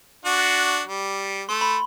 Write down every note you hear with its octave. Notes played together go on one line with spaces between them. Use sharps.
D4 F#4
G3
A3 C6
B5